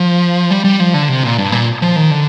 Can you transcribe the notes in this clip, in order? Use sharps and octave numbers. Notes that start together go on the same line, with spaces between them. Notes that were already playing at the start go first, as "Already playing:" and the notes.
Already playing: F3
G3
G3
F3
D3
C3
A#2
G2
A#2
F3
D#3
D3